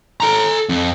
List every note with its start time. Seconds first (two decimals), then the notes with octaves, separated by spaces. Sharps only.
0.20 A4 A#5
0.69 F2